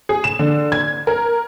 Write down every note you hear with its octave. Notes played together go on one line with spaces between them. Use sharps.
G#4
E7
D3
G#6
A#4